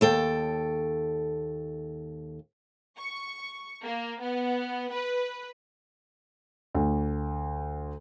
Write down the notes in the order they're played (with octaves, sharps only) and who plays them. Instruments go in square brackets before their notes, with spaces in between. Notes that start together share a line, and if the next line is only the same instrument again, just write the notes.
[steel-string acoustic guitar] D#2 A4 G5
[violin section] C#6
A#3
B3
B4
[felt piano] D2